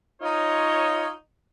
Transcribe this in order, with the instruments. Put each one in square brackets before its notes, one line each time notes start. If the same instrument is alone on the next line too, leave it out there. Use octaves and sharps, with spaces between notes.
[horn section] D#4 F4 C#5